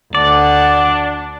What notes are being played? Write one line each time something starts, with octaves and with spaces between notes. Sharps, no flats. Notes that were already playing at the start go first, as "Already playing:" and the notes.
D2 D4 D5 F#5